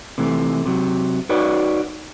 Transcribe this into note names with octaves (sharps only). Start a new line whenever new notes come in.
C3 E3 A3
C3 F#3
D#4 F#4 B4 C#5 D5